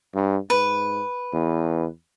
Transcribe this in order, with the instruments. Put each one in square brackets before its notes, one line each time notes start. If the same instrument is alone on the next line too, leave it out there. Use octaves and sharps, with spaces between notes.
[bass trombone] G2
[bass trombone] G#2 [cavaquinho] B4
[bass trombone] E2